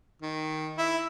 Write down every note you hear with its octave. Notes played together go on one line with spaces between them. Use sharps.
D#3
E4